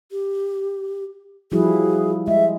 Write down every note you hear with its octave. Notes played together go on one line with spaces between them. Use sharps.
G4
F3 G3 E4 F#4 G#4
G#3 D#5 E5